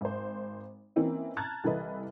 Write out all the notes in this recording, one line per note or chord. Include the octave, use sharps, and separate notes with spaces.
G#1 C5
E3 A#3 C4 C#4 D#4 E4
A5 A#5 F6 F#6 G#6 A6
C2 E3 A4 B4 D#5